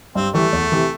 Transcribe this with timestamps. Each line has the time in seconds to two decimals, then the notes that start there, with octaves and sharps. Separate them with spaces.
0.15 G2 C4
0.34 E3 G3 A3
0.53 E2
0.72 C3 E3